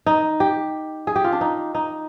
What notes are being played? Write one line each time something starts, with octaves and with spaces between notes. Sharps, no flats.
D#4
G4
G#4
G4
F4
D4
D#4
D#4